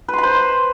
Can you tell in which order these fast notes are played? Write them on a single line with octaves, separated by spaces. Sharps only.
B4 C6 B5 C5